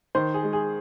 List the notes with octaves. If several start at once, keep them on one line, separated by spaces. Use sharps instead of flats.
D#3 C5
G#4
G#3
G#4